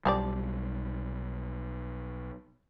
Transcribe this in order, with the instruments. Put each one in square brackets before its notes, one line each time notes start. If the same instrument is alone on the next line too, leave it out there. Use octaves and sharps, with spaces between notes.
[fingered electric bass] B1 G3 [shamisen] F3 G4 D5